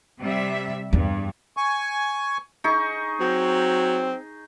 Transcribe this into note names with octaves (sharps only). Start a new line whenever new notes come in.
C3 G3 E5
E2 G2
G#5 C#6
D#4 G#4 C#6
F#3 C4